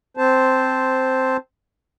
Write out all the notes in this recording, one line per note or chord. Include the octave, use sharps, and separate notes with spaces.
C4 C5 A5